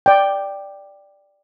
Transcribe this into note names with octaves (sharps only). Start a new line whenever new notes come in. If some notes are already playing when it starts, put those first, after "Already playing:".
D5 G5